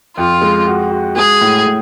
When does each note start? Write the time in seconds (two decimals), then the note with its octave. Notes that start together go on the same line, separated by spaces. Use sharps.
0.17 F2 F4
0.41 G#3
0.67 F#4
0.92 F#4
1.16 G#3 G#4
1.41 A2
1.66 A2